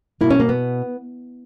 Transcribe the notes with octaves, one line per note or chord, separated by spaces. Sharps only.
B2 A#3 E4
C#4
A#3
B3